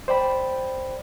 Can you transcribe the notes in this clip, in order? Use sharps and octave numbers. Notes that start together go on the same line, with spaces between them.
C5 D5 G5 B5